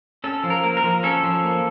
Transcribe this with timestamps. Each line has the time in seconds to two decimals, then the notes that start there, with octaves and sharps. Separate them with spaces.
0.24 C#4 A4
0.44 F3
0.50 A#4
0.64 A#3
0.77 A#4
0.84 F3
1.03 C#4 A4
1.23 F3
1.44 A#3